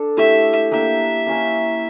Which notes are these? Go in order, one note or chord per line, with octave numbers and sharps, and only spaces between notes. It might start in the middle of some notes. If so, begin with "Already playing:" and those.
Already playing: D4 A4
A3 E4 G4 E5
A#3 D4 G4 E5
A#3 C#4 E4 A#4